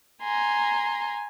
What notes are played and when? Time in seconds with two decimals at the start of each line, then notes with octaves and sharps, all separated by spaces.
0.22 G#5 A#5 C6